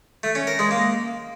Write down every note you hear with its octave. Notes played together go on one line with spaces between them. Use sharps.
A3
C#4
A#4
G#3
A#3